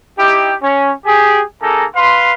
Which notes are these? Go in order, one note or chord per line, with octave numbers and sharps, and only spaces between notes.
D#4 E4 G4
C#4
G4 G#4
A#3 D#4 G#4 A4 A#5
B4 F5 C6